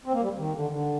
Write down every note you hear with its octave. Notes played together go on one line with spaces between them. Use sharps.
C4
A#3
G3
D#3
D3
D3